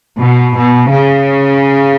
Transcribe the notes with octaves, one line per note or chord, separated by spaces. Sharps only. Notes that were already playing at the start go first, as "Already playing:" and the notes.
B2
B2
C#3